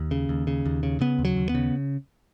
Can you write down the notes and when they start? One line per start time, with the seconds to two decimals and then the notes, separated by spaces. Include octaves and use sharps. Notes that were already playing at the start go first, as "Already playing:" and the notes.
Already playing: D#2
0.11 C#3
0.29 D#2
0.47 C#3
0.65 D#2
0.83 C#3
1.01 C#3 B3
1.19 D#2
1.25 F#3
1.37 D#2
1.49 B3
1.55 C#3